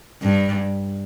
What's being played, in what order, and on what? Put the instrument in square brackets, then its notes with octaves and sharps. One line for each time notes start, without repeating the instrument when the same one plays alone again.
[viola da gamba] G2